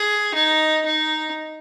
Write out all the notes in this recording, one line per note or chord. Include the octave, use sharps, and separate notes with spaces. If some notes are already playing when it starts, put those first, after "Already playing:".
Already playing: G#4
D#4
D#4